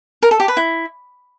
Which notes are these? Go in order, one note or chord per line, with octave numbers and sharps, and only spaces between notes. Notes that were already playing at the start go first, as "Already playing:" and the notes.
A#4
A4
G4
B4
E4